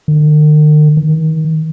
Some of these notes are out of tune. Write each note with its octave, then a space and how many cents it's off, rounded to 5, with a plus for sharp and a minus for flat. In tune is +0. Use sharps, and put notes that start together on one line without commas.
D#3 -45
D#3 +35